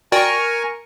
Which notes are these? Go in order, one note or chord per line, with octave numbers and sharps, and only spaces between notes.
F#4 A#4 D5 G5 G#5 C#6